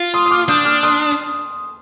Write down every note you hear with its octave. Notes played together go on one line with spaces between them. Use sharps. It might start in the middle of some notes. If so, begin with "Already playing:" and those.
Already playing: F4
C6 D#6
D#6
D6 F6
D4 D#6 G6
D6 F6
C6 D#6